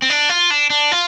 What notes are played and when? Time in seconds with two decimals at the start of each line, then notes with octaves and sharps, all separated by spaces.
0.02 C4
0.10 D4
0.29 F4
0.51 D4
0.70 D4
0.92 F4